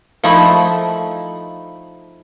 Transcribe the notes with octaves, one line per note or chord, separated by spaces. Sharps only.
F3 A3 D#4 E4 B5 C6